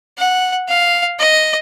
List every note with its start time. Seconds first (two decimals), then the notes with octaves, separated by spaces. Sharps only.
0.18 F#5
0.68 F5
1.19 D#5